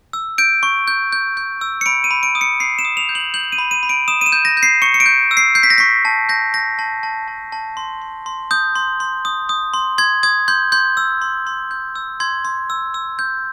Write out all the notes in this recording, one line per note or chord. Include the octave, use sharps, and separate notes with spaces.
E6
G6 D7
C#6
G6
G6
G6
E6
C#7
B5 D7
D#7
B5
D7
D#6
C#7
B5 C7
E7
D#6
F7
G6
F#7
G6 F#7
D#7
B5
D#7
B5
D7
D#6 E7
D#7
E7
G6
A#6
G6
C7
C#6 C#7
C#7
D7
G6
E6
C7
G6 C7
B6
A#6
C#6 B6
A5
G6 A#6
G6 A#6
A5
A5
A5
A5
C6
C6
C6
D#6 G6
C6
C6
D#6
D#6
C6
C6 G#6
D#6 G#6
C6 G6
C6 G6
E6
C6
C6
G6
E6
C6 G#6
C6
E6
E6
G6